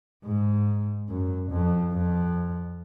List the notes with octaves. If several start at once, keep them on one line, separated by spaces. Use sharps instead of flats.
G#2
F#2
F2
F2